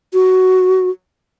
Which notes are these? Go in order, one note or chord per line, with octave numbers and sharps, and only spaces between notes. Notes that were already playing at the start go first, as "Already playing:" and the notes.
F#4